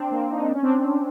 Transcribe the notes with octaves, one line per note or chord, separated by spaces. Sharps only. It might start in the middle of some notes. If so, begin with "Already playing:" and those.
Already playing: C4 D4
A#3 C4
D#4
D4
C#4
C4 D4